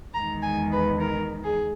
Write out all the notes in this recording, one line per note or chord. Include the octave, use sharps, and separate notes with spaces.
E2 D#3 G#3 A#5
G#5
B4
A#4
G#4